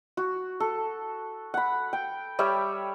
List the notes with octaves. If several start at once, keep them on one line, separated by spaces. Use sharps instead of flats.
F#4
A4
F#5 B5
G5
G3 C#5 E5